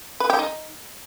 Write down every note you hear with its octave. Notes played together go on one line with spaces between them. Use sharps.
B4
G4
D#4